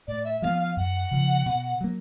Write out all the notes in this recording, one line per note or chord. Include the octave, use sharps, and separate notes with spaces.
A2 D5
E5
F3 G#3 B3 F5
F5
F#2 F#5
C#3 F3
B2
F#3 A#3